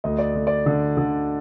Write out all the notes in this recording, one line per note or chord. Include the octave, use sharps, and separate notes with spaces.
D2 D#5
D5
D2
D5
D3
D3